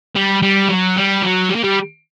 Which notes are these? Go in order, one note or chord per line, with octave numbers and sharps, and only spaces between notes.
G3
G3
F#3
G3
F#3
G3
A#3
G3